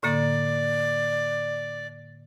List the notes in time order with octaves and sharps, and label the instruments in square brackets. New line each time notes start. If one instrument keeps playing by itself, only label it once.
[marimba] A2 D3 A#3 [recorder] D5